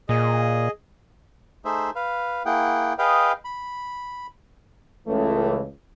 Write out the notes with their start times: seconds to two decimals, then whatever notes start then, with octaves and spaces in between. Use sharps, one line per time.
0.09 A#2 G#4 D#5
1.65 A3 D#4 G#4 C5 E5
1.95 B4 F5
2.45 A#3 E4 G#4 F#5 G5
2.98 G#4 B4 D#5 F5 G5
3.45 B5
5.07 C#2 E3 A3